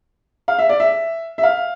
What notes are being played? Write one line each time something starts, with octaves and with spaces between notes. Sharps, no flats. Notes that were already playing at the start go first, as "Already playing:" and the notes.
F5
E5
D5
E5
E5
F5